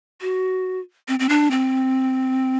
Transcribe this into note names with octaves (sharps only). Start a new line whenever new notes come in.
F#4
C4
C4
D4
C4